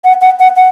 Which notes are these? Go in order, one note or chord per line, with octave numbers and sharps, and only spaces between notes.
F#5
F#5
F#5
F#5